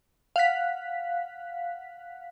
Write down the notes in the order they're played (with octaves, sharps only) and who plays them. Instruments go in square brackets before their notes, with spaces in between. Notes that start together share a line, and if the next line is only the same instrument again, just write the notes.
[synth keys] F5 F#5 F#6 B6